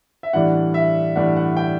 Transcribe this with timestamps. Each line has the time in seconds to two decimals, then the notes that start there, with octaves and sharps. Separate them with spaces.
0.23 E5
0.33 A2 E3 G3 D4 F#5
0.74 E5
1.16 A2 E3 G3 D4 F#5
1.36 F#5
1.57 G5